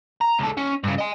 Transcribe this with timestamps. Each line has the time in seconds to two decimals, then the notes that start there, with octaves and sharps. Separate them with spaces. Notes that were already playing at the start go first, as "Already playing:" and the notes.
0.21 A#5
0.39 C#2 A4
0.57 C#4
0.84 G2 C#3
0.98 D#5 G#5